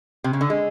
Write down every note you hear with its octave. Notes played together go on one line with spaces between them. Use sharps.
C3
C#3
D3
G#3